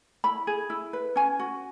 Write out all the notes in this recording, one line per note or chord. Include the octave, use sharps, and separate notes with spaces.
E4 B5
G#4
E4
B4
C#4 G#5
F#4